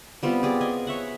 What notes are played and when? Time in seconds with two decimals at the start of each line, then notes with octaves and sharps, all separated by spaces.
0.23 G3 B3 C4 F4
0.43 G4 G#4 D5
0.61 D#5 G#5
0.87 C#5 E5 F#5